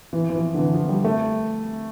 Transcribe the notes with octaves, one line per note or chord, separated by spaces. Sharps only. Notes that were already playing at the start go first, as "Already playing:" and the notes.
E3
E3
F3
D3
E3
F3
G3
A3